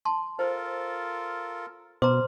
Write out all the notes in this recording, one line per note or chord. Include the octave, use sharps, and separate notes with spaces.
A5 C6
F4 A4 A#4 C5
B2 C5 A#5 C6 D6